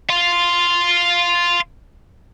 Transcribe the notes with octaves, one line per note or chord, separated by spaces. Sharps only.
F5 C6